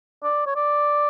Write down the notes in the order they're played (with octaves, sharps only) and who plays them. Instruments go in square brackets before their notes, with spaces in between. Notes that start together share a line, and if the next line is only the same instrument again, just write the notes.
[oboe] D5
C#5
D5